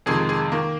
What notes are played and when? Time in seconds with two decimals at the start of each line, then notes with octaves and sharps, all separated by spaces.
0.06 F2 C3 D#3 G#3 G#4
0.29 G#4
0.52 D#3 A#3